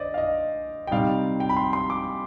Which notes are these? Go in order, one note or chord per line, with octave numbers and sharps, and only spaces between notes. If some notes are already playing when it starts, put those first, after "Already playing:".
Already playing: D3 C5 D5 D#5
F5
D#5
G5
C3 G3 C4 D#4 F5
G5
B5
C6
C6
D6